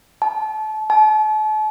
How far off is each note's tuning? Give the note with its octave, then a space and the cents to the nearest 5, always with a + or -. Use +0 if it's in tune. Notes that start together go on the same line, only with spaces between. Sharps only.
A5 -30
A5 -40